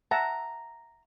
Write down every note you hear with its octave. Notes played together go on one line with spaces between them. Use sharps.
E5 F#5 A5 A#5